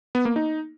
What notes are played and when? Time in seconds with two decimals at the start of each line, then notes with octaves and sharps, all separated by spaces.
0.15 B3
0.25 A#3
0.36 D#4